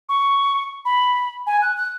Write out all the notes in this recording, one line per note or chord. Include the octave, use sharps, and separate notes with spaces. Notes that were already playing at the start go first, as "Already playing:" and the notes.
C#6
B5
G#5
F#6
F#6